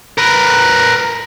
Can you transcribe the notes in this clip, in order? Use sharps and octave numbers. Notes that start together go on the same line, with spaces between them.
A#4 B4